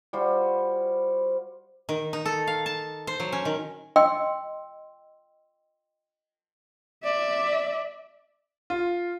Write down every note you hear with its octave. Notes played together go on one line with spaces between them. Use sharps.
G3 F4 F#4 C5
D#3
D#4
A4
F5
A5
C5
F#3
C#4
D#3
D#5 G5 C6 E6
D5 E5
F4